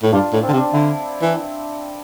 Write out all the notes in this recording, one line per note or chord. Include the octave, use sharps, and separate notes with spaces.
A2
G2 D4 F4
A2
C4
D3
C3
D4
D3 E4
E3